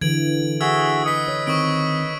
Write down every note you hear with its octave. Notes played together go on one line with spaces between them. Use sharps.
D3 E3 G#6 D7 F#7
F#4 G#4 E5 D#6 E6 G#6
B4 D#5 D#6 B6 C#7
C#5
D#3 C4 C#6 D#6 D7